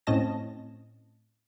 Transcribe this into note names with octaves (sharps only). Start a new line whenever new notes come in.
A2 C4 C#4 D#5 A5 A#6